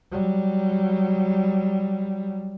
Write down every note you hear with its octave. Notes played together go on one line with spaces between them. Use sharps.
F#3 G3